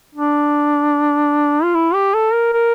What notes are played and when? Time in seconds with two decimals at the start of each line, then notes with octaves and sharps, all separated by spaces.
0.15 D4
1.63 F4
1.75 E4
1.94 G4
2.14 A4
2.33 A#4
2.53 A#4